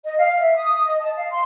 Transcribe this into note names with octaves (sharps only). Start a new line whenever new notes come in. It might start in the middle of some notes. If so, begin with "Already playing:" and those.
D#5
F5
E5
D#6
D#5
A5
F5
C6